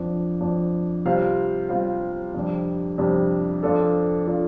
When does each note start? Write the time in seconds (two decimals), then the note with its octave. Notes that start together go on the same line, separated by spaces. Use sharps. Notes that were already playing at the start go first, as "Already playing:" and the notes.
Already playing: F2 F3 D4
0.41 F2 F3 D4
1.05 C3 G3 F4 C5 F5
1.69 C3 G3 F4 C5 F5
2.34 F2 C3 G3 D4
2.98 F2 C3 G3 D4
3.63 F2 F3 D4 F4 A4
4.27 F3 D4 F4 A4